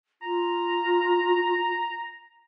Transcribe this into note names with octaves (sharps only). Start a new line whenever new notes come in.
F4 A#5